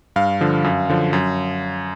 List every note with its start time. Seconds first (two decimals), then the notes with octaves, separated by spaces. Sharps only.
0.16 G2 F5
0.41 D3 F3
0.64 F#2
0.90 D3 F3
1.13 F#2